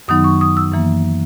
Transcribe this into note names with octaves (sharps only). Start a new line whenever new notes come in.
F#2 D#3 F#3 B3 D#4 D#6
C#6
D#6
E6
F#2 E3 A#3